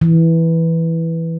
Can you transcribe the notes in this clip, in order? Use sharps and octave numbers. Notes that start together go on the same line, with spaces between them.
E3